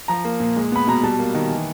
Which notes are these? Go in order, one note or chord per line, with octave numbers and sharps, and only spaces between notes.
F3 A#5
A#3
A#2
G#3
B3 B5
B2 A#5
G3 A5
A#3
D#3
E3